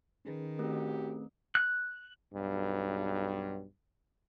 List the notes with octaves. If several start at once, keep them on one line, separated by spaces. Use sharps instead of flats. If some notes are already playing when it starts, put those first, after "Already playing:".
D#3 C#4 G#4 B4
A2 A3 C4 F#4 G4 A#4
F#6
B1 G2